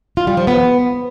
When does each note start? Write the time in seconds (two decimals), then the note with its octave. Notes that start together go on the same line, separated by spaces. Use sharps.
0.17 F4
0.27 G3
0.37 F3
0.47 B3